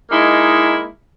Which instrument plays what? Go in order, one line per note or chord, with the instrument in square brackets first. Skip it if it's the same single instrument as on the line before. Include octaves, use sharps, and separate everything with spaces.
[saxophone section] G#3 A#3 D#4 E4